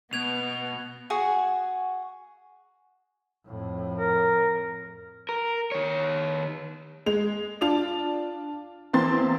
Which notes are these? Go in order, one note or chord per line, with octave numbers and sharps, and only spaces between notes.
B2 B3 G#6 F7
F#4 G#4 F#5
F2 A2
A#4
A#4
D#3 C#5
G#3 F7
D4 F4 A5 F7
E2 A#3 C4 C6 A6